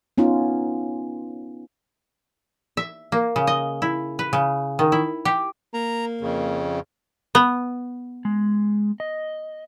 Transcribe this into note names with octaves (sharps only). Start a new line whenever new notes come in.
B3 C#4 D#4 F4
E5
A#3
C#3
D#5
E4
B4
C#3
D#3
E4
G4
A#3 A#5
F2 C#3
B3
G#3
D#5